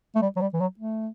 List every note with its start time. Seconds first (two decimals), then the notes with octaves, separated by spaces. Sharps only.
0.16 A3
0.22 G3
0.36 F#3
0.41 G3
0.54 E3
0.61 F#3
0.80 A3